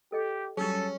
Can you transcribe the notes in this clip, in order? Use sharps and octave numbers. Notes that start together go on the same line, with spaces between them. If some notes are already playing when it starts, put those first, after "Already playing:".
G4 A4 D#5 G5
F#3 G3 C#4 D4 G#4 A4